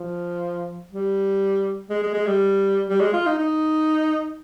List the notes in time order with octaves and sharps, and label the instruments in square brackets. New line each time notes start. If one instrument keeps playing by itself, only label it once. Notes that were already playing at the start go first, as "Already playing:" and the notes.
Already playing: [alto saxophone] F3
G3
G#3
G#3
G#3
G3
G3
G#3
F4
D#4
D#4